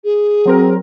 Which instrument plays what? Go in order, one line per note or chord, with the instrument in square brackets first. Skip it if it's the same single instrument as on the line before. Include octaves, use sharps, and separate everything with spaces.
[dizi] G#4
[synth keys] F#3 C4 A#4